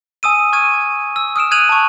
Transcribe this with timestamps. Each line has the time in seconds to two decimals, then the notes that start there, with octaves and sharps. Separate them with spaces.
0.23 G#5 D#6 E6 D#7
0.53 C#6 F6 G#6 D#7
1.16 E6
1.36 D#6 F6 D7 E7
1.51 F6 F#6 G#6 D#7 F7 F#7
1.69 A5 C#6